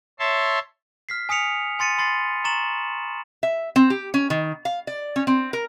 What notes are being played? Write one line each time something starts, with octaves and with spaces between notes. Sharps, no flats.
C#5 E5 A5 C6
F6 B6 C7
G#5 D#6 B6 C#7 F7
G#5 C6 A6 C#7 D#7
B5 C6 A6 C7
A#5 C#6 A6 E7 F#7
E5
C4
G4
C#4
D#3
F5
D5
C#4
C4
A#4